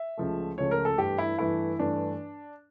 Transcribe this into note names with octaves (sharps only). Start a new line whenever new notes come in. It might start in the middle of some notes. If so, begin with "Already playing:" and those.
Already playing: E5
C#2 C#3 F3 A3
C#2 C#3 F3 A3 C#5
A#4
A4
G2 E3 A3 G4
E4
G2 E3 A3 E4
G2 E3 A3 D4